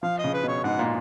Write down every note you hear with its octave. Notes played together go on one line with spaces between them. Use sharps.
F3 F5
D#5
C#3
B4
B2 C#5
G#2 F#5
A#2